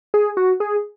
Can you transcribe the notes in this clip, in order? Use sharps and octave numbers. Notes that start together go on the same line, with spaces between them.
G#4
F#4
G#4